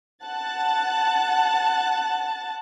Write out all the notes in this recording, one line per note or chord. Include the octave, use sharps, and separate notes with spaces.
F#5 A5 F#6 A6